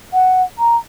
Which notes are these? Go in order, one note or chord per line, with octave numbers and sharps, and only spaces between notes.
F#5
A#5